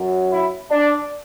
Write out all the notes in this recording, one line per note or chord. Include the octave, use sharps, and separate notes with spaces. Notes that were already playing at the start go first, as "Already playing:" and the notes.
Already playing: F#2 F#3
E4
D4